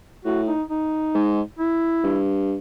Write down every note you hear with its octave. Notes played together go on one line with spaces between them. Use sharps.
A2 F#4
D#4
D#4
G#2
E4
G2